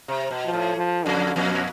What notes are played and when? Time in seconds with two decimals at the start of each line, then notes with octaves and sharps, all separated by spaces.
0.08 C3
0.31 B2
0.45 F3
0.53 A2
0.76 F3
1.05 F2 D3
1.35 F2 B2